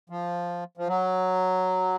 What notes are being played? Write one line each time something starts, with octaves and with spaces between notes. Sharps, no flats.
F3
F3
F#3